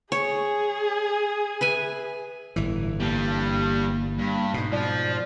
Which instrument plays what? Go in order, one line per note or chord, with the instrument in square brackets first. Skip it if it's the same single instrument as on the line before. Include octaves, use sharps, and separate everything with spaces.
[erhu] G#4 [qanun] C#5
[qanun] B4 E5 G#5
[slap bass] G1 E3 [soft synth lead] A2
[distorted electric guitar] G3 D4 [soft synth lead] A#3
[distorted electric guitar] G2
[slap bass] G#2 B2
[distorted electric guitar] F3 [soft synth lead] D5